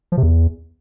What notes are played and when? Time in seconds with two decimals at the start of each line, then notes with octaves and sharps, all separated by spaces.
0.12 F3
0.17 C3
0.23 E2